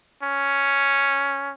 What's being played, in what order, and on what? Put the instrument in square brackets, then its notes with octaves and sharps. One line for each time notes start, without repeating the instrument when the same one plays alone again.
[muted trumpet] C#4